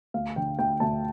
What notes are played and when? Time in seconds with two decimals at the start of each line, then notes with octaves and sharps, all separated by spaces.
0.14 D2 F5
0.36 D3 G5
0.59 D2 G5
0.80 D2 A5